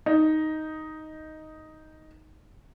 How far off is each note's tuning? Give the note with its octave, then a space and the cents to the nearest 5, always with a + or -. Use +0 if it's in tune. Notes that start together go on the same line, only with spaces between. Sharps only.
D#4 +5